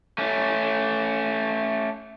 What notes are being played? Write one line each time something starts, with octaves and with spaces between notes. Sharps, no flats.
A3 C#4